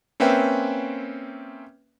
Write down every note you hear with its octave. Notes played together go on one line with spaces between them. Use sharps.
A#3 C4 C#4 B4 E5 G5